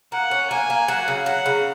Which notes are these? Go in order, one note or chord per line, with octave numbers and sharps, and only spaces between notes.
A#3 F#5
C#4
A#3 G#5
A#3
F#3 F#5
C#3
F#3 F#5
C#3